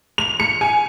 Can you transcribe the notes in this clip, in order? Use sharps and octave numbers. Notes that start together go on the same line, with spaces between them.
F7
C#7
G#5